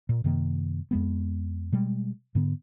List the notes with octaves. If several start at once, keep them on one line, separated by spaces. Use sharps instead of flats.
A#2
F#2 C3 D#3 A#3
F2 G#3 B3
B2 G3 G#3
G#2 D3 B3